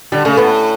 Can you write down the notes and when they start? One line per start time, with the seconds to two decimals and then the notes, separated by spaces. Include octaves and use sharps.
0.12 D3 G3
0.25 C#3 A3
0.37 A2 B3